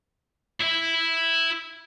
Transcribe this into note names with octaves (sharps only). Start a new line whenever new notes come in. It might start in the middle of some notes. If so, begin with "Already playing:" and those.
E4 E5